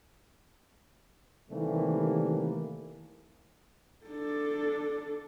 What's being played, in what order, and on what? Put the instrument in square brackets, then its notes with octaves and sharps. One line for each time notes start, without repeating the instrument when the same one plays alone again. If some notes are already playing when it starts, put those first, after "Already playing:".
[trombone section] C3 D#3 E3 G3 A3 A#3
[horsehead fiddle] D4 A4